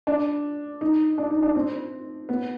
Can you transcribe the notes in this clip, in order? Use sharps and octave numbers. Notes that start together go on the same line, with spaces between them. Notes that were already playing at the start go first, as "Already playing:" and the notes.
D4
D#4
D4
D#4
D4
C4
B3